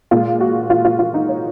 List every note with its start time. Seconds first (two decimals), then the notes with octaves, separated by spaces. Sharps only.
0.11 A#2 G#3 F4
0.40 F#4
0.70 F4
0.85 F4
0.99 F4
1.14 D#4
1.29 C#5